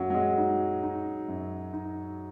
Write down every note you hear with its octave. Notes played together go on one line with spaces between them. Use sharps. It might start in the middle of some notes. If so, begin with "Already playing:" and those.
Already playing: F#2 F#3 A#3
F#3
G#3
D#4
D#4
F#2
D#4